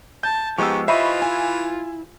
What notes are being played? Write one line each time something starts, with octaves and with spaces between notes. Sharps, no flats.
A5 G6
G#2 F3 G#3 B3 G4 C#6 E6
E3 F4 C5 D#5 E5 B5 C#6
E4 G#5